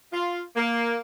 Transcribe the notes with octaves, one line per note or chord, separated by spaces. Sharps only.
F4
A#3